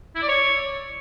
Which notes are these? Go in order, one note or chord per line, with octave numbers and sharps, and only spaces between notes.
E4
D5
C#5